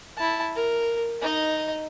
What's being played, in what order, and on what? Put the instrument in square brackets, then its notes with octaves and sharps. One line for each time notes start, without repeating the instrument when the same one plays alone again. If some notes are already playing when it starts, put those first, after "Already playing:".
[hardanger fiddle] E4 A5
A#4
D#4 D#5